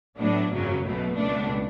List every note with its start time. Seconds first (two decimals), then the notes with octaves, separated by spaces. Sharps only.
0.18 A2 F#3 B3 D4
0.51 G#1 F#2 C#3 F#3
0.83 B1 B2 A3
1.16 C#2 B2 A3 D4